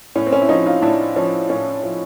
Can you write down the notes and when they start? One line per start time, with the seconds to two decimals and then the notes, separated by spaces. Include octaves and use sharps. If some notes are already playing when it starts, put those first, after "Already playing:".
0.16 A2 C#4
0.27 C4
0.32 C#4
0.42 E4
0.49 F3 C#4 D#4
0.66 D#4 F4
0.82 A2 D4 E4
1.16 F3 C#4
1.50 A2 C#4
1.83 F3